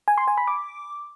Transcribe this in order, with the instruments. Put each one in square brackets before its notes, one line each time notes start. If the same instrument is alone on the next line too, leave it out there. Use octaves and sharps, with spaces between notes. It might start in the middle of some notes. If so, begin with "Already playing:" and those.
[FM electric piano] G#5
C6
G#5
B5
D6